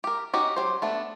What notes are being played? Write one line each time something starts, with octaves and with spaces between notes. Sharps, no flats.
G4 A#4
C#4 D#4 F#4 G4
F#3 G4 C5
A3 B3 D4